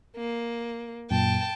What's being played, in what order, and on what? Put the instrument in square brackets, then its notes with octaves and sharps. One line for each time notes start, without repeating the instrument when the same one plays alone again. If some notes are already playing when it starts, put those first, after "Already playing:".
[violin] A#3
[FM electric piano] F#2 A#2 [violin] G5 A5